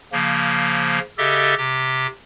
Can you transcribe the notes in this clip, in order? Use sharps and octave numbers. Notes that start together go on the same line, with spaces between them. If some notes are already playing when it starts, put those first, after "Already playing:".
C#3 F3 A#3
C#3 G4 A4 D#5 E5 A6
C3 G4